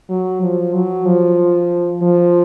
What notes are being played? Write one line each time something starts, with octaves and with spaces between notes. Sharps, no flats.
F#3
F3
F#3
F3
F3